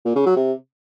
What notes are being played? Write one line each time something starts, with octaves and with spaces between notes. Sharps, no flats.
A#2
C#3
F#3
C3